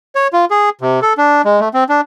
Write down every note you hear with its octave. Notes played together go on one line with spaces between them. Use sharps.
C#5
F4
G#4
C3
A4
D4
G#3
A3
C4
D4